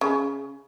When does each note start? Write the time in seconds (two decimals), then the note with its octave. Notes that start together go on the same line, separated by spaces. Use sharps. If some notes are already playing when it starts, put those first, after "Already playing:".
0.01 C#3